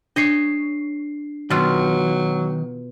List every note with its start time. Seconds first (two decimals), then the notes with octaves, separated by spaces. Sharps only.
0.16 D4 C#5 D#5 C7
1.50 B2 D#3 F#3 F4